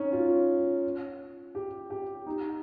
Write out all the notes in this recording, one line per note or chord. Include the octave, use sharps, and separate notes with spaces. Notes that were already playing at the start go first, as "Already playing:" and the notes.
Already playing: C#4 D#4
F4
G4
G4
D#4